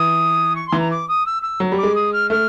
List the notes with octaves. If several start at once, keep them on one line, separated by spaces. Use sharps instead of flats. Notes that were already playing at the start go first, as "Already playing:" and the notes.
Already playing: E3 D#6
C#6
C6
E3
A#5
D6
D#6
E6
E6
F#3
G3
D6
G#3
D#6
F6
A3 F6